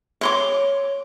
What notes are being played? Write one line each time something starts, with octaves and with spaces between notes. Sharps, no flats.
C#5 C6 D6